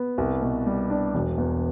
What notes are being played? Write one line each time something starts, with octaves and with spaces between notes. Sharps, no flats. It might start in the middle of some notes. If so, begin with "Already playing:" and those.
Already playing: B3
C2
B2
G3
D4
E1
E2